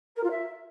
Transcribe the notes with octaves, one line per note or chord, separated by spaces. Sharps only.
A#4
F4
E5